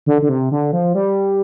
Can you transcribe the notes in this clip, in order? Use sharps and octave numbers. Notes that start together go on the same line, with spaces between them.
D3
D3
C3
D3
F3
G3